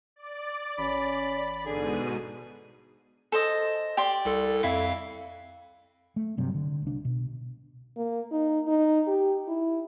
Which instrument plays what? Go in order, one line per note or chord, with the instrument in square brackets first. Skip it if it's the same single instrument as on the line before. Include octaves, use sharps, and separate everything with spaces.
[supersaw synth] D5
[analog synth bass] A1 [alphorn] C#4 [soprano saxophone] B5
[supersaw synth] G#2 B2 D#7 [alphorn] D3 [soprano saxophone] G#4
[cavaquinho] A4 C5 D#5
G4 D5 C6
[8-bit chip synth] C2 A4
[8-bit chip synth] F2 F5 [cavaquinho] E4
[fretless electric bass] A3
G2 C3 F#3
D3
C2 D4
B2
[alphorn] A#3
D#4
D#4
G4
E4